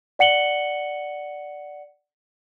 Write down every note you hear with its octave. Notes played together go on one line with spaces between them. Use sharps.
D5 F#5 C#7 F#7 G7